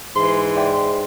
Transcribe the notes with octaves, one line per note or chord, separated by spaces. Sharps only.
G#2 E3 C6
D5 E5 G5